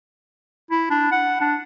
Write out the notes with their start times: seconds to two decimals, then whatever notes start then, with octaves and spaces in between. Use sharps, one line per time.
0.71 E4
0.91 D4
1.12 F#5
1.41 D4